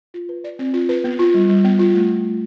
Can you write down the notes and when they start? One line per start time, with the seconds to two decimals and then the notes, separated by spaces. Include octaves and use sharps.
0.14 F4
0.29 B4
0.44 D5
0.59 C4
0.74 F4
0.89 B4
1.04 B3
1.19 F4
1.34 G3
1.49 G3
1.64 B3
1.79 F4
1.94 A3